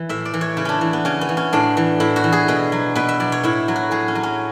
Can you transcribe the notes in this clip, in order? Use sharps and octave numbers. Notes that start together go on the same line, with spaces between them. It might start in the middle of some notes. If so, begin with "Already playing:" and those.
Already playing: E3
A2 E5
D5
E3
C#5
C#3 E4
C#4 D4
E3
B3
C#3 C#4
B3
E3
C#4
A2 D4
E3
A2 E4
F#4
E3
G#4
B2 B4
F#3
B2 B4
E5
F#3 D5
C#5
A2 E4
F#3
F#4
A2 G#4
C#4
F#3
C#4